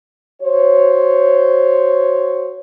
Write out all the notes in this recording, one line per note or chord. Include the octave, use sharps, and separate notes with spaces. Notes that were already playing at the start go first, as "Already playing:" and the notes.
F#4 C5 C#5